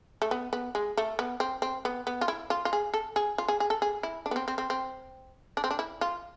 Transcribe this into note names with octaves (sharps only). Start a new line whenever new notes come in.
A3
B3
B3
G#3
A3
B3
C4
C4
B3
B3
F4
E4
F4
F4
G#4
A4
G#4
F4
G#4
G#4
A4
G#4
E4
D4
B3
C4
C4
C4
C4
D4
C4
D4
E4
F4